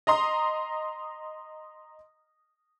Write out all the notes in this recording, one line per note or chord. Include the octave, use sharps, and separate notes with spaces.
D#5 A#5 C6 D#6